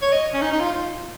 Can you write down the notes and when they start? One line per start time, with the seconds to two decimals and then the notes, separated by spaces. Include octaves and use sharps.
0.02 C#5
0.12 D#5
0.34 C#4
0.41 D#4
0.52 D#4
0.60 F4